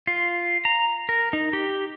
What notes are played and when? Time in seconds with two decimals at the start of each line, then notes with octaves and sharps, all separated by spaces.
0.07 F4
0.65 A#5
1.09 A#4
1.33 D#4
1.53 G4